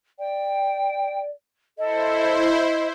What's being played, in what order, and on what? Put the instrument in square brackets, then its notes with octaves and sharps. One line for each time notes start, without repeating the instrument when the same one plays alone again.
[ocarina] D5 [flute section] G5
[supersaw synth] E4 C5 [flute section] A4 [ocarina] D#5